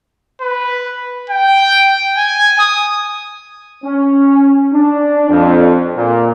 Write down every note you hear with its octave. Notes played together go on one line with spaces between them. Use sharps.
B4
G5
G#5
D#6
C#4
D4
F2
A#2